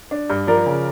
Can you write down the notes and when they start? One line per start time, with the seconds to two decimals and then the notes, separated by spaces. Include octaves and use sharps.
0.11 D4
0.30 G2
0.47 F3 A#4 D5
0.66 C#3